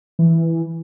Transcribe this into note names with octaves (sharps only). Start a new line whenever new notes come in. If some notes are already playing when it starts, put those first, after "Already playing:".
E3